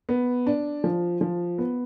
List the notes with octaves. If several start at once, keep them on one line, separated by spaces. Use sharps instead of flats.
B3
D4
F3
F3
B3